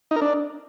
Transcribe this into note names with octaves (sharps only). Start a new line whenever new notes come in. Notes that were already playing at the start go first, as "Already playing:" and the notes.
D#4
A#4
D4